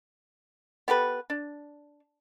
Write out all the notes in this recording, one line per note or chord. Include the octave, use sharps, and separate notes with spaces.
B3 G4 A4 B4
D4